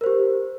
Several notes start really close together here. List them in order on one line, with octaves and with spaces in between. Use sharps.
A#4 C5 G4